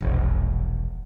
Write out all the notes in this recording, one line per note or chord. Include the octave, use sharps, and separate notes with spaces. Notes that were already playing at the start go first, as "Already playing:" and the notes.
E1 A#1